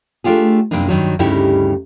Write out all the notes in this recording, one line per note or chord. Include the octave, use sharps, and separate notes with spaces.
A3 D4 F4 G4 G#4
F#2 C3 G3 A#3 D4 D#4
G2 D#3 F#3
D2 G2 C#3 D#4 E4 G4